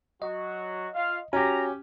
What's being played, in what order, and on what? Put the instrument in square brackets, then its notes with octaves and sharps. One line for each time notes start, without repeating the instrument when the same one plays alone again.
[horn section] F#3 F#4 [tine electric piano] D#5
[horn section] F4 F5
[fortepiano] C#4 G4 [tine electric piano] F#4 [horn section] A#5